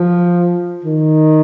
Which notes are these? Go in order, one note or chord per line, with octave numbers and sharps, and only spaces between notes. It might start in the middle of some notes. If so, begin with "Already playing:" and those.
Already playing: F3
D#3